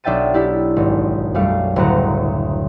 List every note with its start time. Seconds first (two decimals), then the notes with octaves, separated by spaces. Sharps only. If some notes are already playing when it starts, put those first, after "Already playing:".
0.04 B1 D4 E5 G5 A6 D#7
0.34 D4 E4 G4
0.76 G#1
1.34 F#2 G3 A3 F5
1.76 F#1 D2 A2 F#4 A#5 F#6